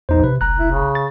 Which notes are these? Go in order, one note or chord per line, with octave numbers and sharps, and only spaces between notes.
A#1 E2 D#4 C5
C3 B4
F1 B1 A#5 F#6
E4
C#3
A6